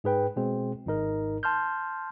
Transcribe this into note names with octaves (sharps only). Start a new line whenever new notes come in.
G#2 G#4 B4 G5
B2 G#3 C4 G#4
G#1 G#2 D#4 A#4
A5 C6 F6 G6